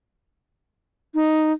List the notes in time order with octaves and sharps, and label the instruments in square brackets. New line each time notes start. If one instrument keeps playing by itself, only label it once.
[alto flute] D#4